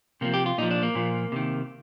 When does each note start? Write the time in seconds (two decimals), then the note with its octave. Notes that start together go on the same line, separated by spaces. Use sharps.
0.21 C3 F3 A#3
0.34 G4
0.46 F4
0.58 A#2 F3 D#4
0.71 D4
0.83 A#3
0.95 A#2 F3
1.32 C3 D#3